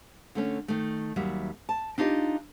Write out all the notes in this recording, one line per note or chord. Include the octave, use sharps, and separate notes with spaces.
D3 A3 C#4
D#3 A3
D#2 F#3 G3 E5
A5
D4 D#4 F4 G4 D#5